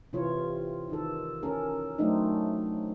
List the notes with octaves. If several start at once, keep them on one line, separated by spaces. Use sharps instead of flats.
C3 E3 F4 C#5
D#3 A4
C#4 A4 A#4
F#3 A3 C4 D4 D#4